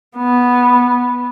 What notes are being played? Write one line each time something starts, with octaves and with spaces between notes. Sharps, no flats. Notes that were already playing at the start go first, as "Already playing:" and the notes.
B3